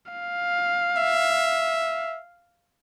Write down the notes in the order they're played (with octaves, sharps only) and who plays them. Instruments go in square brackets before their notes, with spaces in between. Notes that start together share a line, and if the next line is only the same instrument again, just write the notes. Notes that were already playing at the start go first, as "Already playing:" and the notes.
[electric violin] F5
[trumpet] E5